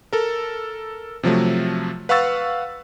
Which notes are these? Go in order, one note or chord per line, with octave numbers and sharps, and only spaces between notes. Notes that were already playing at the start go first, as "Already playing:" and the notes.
A4 A#4
C3 F3 F#3 A3
B4 F5 F#5 C#6 E6 A6